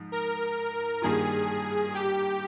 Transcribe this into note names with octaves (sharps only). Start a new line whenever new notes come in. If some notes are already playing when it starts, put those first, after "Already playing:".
Already playing: G#2 F3
A#4
G2 D#3 A#3 F4 G#4
G4